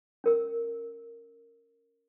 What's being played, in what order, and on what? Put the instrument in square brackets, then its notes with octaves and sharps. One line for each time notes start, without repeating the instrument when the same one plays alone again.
[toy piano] C#4 A#4 E6